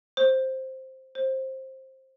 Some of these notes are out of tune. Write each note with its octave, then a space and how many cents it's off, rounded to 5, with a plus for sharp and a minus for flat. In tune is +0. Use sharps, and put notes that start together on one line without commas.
C5 +5
C5 +15